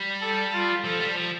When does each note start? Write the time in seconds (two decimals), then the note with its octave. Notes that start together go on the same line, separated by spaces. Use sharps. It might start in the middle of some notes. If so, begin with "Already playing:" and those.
Already playing: G3
0.21 A4
0.53 F4
0.84 F3 A4
0.99 G3
1.16 F3